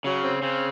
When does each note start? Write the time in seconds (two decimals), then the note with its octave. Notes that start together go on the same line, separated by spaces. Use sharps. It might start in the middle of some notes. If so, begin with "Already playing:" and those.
0.04 C#3 F#3
0.22 C4
0.42 C#3 C4